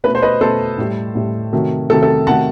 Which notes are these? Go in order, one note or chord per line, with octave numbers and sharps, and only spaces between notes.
B2 A3 B4
C5
B4 D#5
B2 A3 A4 C5
A2 G3
A2 G3
C3 D#3 F#3 A3
C3 D#3 F#3 A3 A4
A4
C3 D#3 F#3 A3 F#5 A5